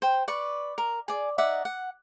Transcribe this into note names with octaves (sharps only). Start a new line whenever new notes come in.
C5 G5
B4 D5 C#6
A#4
G#4 D5
D#4 D5 E5 F#5
F#5